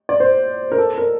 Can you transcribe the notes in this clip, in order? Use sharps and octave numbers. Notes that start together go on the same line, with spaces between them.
D5
C5
A#4
A4
A#4